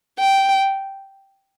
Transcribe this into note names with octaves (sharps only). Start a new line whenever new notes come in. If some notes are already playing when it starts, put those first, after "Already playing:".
G5